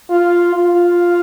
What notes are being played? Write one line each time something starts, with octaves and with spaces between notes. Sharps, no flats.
F4
F4